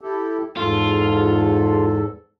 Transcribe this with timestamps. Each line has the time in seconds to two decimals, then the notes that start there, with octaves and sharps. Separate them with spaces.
0.01 E4 G4 A4
0.57 E2 G#2 F4 A4